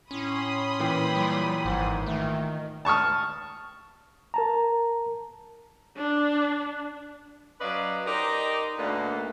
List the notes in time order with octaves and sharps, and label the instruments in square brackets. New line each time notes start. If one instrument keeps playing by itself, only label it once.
[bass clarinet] A2 [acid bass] C#4 [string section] B5 C6 D#6
[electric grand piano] A#2 E3 G5
[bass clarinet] F#3 [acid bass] G3
[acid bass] G#1 [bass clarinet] G#2
[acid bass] D#3 [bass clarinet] A3
[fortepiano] A5 C#6 D#6 F6
[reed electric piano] A#4 A5 A#5
[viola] D4
[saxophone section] F#3 C#4 B4 D5 D#5 F5
D#4 G4 A#4 C5 D5 D#5
D2 A#2 D3 A#3 D#4 B4